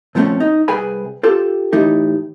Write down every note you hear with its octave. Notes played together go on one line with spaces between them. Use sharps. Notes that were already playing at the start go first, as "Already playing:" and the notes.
A#2 F3 A3 A#3 C4 C#4
D#4
C2 G#4 B4 G5 G#5 B5
F4 G4 A4
A2 E3 D#4 G4